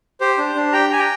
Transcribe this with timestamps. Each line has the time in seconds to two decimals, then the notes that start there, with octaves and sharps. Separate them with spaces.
0.21 G4 C5
0.38 D4
0.55 D4
0.73 G4 G5 A#5
0.90 G4 G#5
0.99 G5 A#5